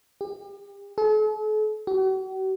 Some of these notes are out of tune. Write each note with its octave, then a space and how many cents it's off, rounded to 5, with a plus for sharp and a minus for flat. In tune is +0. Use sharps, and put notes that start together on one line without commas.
G4 +35
A4 -45
F#4 +45